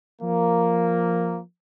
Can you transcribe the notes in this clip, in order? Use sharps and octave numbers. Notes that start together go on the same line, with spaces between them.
F3 A#3